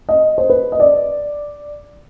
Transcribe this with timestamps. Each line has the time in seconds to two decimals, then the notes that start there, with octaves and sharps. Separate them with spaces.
0.09 D#5
0.38 C5
0.50 B4
0.72 D#5
0.80 D5